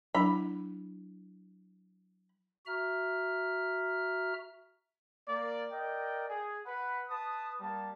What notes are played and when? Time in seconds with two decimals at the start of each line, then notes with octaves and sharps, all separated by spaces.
0.15 F#3 D4 E4 B5
2.66 F#4 E5 A#5 F6
5.28 A#3 D5
5.71 A#4 D5 D#5 G5
6.27 G#4
6.65 B4 F#5 B5
7.08 B4 A5 D#6
7.60 G3 A#3 A5